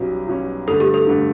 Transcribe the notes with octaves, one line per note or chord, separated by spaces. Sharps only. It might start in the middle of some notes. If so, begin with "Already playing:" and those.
Already playing: B1 B2 G3 C#4
B1 B2 G3 C#4
G2 D3 A3 A4
G4
A4
G2 D3 A3